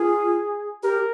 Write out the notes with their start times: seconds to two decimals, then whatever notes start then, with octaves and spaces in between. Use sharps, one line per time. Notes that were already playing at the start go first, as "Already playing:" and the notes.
Already playing: F4 G#4
0.83 G4 A#4